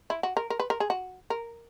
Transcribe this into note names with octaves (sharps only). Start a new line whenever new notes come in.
E4
F#4
A#4
A#4
B4
A#4
G#4
F#4
A#4